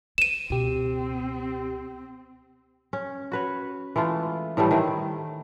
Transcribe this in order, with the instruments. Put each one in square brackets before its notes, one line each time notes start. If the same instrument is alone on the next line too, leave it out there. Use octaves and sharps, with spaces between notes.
[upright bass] C4 [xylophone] D#7 E7
[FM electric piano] C#2 G4 [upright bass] B2 [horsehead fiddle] C4
[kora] C#4
F#4 B4 C#5
E3 G#3 A3 F4
A2 E3 G3 A3
D#3 A3 E4 C5